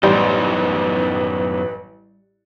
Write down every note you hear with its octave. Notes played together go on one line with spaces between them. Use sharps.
A1 F#2 G3 B3 D#4 B4 C5